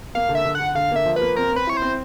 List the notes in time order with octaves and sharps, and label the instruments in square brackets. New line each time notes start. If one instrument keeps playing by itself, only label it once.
[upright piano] A#3 [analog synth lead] F5
[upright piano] D3
[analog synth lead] E5
[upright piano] D3
[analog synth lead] F#5
[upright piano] D3
[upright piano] D3 [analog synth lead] F5
[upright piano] A#3 [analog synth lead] E5
[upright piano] F3
[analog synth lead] B4
[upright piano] A#3
[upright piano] C4 [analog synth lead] A#4
[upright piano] C4 [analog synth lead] B4
[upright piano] E4 [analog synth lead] C#5
[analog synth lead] C5
[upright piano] C4